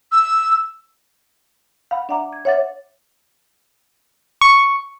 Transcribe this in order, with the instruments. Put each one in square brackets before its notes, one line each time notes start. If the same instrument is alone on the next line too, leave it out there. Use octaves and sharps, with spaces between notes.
[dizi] E6
[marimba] F5 F#5 B5
D4 D5 E5 F#5 A#5 D6
G#6
C#5 E5 F#5 D6 A6
[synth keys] C#6